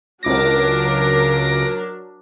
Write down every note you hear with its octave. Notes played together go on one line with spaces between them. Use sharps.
C#2 F#3 D4 A#4 D6 A#6